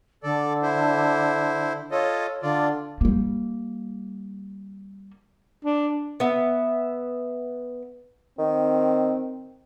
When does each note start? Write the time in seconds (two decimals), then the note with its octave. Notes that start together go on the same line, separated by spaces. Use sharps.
0.23 D3 A4 D5
0.62 E4 C5
1.91 F4 A4 C#5 D#5
2.42 D3 F4 D5
3.01 G3 A#3
5.65 D4
6.20 B3 E5
8.38 D#3 C4